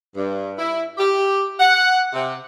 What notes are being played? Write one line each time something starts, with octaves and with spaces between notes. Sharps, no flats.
G2
E4
G4
F#5
C3